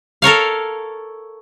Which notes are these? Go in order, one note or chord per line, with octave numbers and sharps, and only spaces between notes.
A4 A#4 C#5 F5